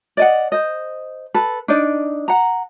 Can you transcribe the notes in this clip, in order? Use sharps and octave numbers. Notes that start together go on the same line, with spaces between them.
D5 D#5 F#5
C5 D#5
A4 B4
D4 D#4 D5
F#5 A#5